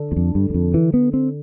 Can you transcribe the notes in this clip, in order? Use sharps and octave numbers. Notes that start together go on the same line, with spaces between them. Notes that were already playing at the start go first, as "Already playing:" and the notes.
Already playing: D3 D4 A4
E2
F2
G2
G2
F2
E3
B3
C4